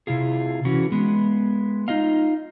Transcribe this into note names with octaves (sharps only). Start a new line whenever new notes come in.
C3 E4 F4 G#4
E3 C#4 F#4
G#3 B3
D#4 F4 D#5 F5